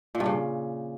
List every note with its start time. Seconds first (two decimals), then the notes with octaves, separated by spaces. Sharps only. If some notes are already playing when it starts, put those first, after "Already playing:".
0.15 A#2
0.20 G2
0.26 C#3